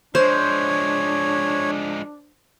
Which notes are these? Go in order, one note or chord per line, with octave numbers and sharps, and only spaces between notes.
F3 G#3 D4 C5 C#5